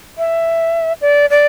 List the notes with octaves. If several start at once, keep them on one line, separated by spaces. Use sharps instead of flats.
E5
D5
D5